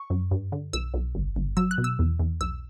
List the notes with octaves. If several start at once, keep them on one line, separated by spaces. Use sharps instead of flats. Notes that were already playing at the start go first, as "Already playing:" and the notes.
Already playing: C#6
F#2
G2
D3
B1 E6
B1
G1
G1
F#3 E6
F#6
B2
E6
E2
E2
B1 E6